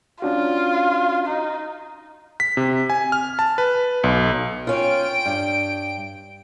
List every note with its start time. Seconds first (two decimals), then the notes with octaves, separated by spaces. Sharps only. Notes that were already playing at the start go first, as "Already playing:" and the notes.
0.22 C#4 D4 F4 F#4
1.26 D#4
2.40 B6
2.57 C3
2.90 G#5
3.12 F6
3.39 A5
3.58 B4
4.04 B1
4.67 C#4 F4 G5 D7
5.26 G2